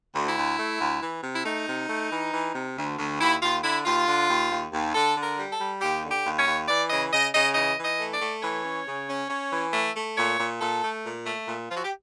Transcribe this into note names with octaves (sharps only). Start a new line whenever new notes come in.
D2
E4
D2
A3
D2
E3
C3
E4
A3 D#4
C3
A3
E3
E3
C3
D2
D2
D#2 E4
D#2 F4
D3 E4
D#2 F4
D3
D#2
D#2
D#2
D3 A4
D3
A#4
G3
A4
G3
D#2 G4
D3
G4
D#2
C#5
D#2
E3 D5
C#3 D#5
C#3 D#5
C#3 D#5
E3 D#5
E3
D#5
A3
D5
A3
E3 C#5
C#4
C#3
C#4
C#4
E3
A3
A3
A#2 C#5
A#2
A#2 A4
A3
A#2
A3
A#2
F3 F4
F#4
G4